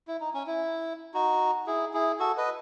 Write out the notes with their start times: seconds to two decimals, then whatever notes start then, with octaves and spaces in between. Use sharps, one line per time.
0.07 E4
0.21 D#4
0.34 C#4
0.47 E4
1.14 D#4 F#4
1.66 E4 G#4
1.93 E4 G#4
2.19 F#4 A4
2.37 B4 D#5